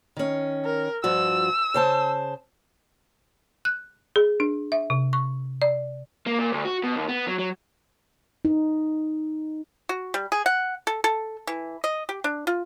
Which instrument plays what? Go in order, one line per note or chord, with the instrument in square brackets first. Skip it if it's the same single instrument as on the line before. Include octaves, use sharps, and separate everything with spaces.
[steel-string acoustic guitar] D#3 C#4
[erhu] A#4
[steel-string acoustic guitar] G2 F3 F#4 [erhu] E6
[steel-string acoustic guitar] C#3 C5 A5
[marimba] F#6
G#4
D4
E5
C3
C#6
D5
[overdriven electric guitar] A#3
A#2
D2
F#4
B2
D#2
B3
F#3
F#3
[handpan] D#4
[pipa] F#4
G3
G#4
F#5
A4
A4
E3
D#5
G4
D4
F4